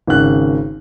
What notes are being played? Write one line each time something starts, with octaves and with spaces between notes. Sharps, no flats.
G#1 C#3 F#6